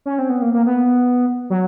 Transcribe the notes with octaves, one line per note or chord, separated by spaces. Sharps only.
C#4
C4
B3
A#3
A#3
B3
F#3